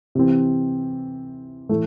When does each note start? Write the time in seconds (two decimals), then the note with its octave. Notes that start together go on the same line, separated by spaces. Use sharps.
0.15 C3 E3 C4
1.69 A2 E3 A3